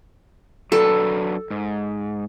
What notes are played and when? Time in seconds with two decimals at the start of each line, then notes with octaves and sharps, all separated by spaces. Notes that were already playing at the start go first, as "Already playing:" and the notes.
0.72 F#3 D4 A4 B4
1.51 G#2